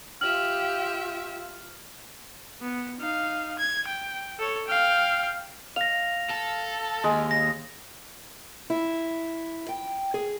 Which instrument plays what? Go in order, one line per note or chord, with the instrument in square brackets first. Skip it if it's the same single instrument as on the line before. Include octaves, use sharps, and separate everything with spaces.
[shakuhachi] F4 [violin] G4 E5 [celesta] F6 F#7
[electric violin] B3
D#4 F5
G#6
G5
A4 C#5
F5 G5
[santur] F5 [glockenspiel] A#6 F7
[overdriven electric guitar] A4
[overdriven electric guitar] D#2 [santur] G#3
[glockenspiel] A#6
[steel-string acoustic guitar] E4
G5
G#4